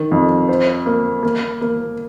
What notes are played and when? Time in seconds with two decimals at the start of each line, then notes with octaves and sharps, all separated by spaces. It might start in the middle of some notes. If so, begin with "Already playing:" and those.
Already playing: D#3
0.11 F2
0.49 C5
0.86 A#3
1.23 A#3
1.61 A#3